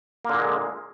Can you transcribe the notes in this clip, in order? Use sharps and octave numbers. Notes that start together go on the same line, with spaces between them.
A#2 D3 G#3 A#3